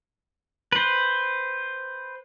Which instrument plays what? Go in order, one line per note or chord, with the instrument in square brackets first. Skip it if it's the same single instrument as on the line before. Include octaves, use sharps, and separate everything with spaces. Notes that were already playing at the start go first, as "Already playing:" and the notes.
[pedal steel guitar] B4 C5